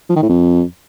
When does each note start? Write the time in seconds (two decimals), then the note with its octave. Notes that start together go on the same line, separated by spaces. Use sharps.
0.10 F3
0.16 D#3
0.23 A2
0.29 F2